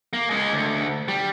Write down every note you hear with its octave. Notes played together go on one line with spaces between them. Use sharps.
A#3
G#3 C#4
D2
G3